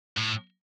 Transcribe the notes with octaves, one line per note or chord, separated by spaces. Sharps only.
A2